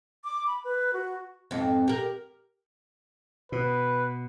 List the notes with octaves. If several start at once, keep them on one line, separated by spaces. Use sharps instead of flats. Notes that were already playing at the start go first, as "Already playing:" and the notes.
D6
B5
B4
F#4
F2 G#2
G4 A#4
B2 B4